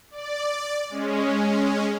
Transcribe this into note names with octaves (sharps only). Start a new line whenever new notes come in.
D5
G#3 C#4